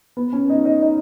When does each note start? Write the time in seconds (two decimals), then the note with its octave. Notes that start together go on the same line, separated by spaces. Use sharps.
0.17 B3
0.33 C#4
0.50 D#4
0.65 D#4
0.82 D#4